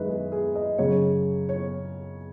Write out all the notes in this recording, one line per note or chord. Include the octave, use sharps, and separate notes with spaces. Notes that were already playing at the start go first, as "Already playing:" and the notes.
Already playing: F#2 D#3 G#3 B4 D#5 E5
G#4
G#4
D#5
F#2 C#3 F#3 C#5
C#5